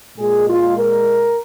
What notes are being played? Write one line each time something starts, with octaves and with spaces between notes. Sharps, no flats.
A#2 G#3 G#4
F4
A#4